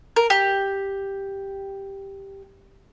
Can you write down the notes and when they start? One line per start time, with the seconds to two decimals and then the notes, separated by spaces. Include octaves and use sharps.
0.16 A#4
0.30 G4